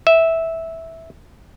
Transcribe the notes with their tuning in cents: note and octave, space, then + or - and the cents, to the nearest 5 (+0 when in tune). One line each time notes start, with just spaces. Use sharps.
E5 -10